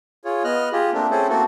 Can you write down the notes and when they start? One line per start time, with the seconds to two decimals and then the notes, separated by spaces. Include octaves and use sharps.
0.25 F4 G#4 C#5
0.44 B3 D#5 F6 F#6
0.72 F4 G4 G#4
0.94 A3 A#3 C4 D4
1.11 C4 C#4 E4 G#4 A4 C5
1.29 A3 A#3 C4 F#4 A4